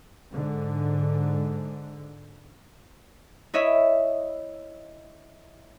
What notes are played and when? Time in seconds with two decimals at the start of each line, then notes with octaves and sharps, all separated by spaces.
0.31 G#2 D3
3.54 E4 C#5 D#5 E5